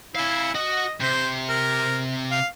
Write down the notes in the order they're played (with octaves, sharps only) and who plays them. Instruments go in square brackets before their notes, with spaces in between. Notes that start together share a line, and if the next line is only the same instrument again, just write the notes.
[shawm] E4 [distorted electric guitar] F5 G#5
[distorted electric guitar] F#4 [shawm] D#5
[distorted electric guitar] C3 [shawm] C5
[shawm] A#4
F5